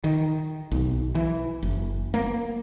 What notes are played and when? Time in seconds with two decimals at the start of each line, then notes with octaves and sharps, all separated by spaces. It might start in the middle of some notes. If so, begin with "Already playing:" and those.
0.04 D#3
0.72 B1
1.15 E3
1.63 F#1
2.14 A#3